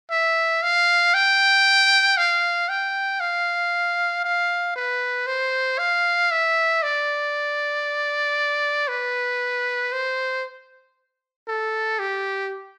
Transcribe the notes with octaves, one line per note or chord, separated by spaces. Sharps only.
E5
F5
G5
F5
G5
F5
F5
B4
C5
F5
E5
D5
B4
C5
A4
G4